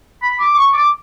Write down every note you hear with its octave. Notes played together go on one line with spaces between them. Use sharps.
B5
D6
C#6
D6